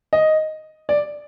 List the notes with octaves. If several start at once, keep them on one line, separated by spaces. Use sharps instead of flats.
D#5
D5